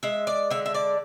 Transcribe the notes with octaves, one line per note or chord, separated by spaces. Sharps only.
G#3 E5
D5
D3 E5
E5
D5